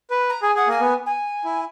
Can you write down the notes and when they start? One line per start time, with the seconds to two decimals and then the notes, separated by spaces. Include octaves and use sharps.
0.10 B4
0.29 A#5
0.42 G#4 G#5
0.55 G#4 F#5
0.67 A#3 G#5
0.80 B3
1.06 G#5
1.44 E4